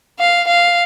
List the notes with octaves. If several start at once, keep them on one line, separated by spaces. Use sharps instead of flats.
F5
F5